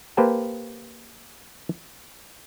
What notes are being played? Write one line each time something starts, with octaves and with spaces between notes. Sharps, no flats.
A#3 G4 B4 C5 G5 A5